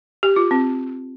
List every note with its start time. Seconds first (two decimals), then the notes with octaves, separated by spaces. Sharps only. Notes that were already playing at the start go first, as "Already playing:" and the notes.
0.23 G4
0.36 F4
0.51 C4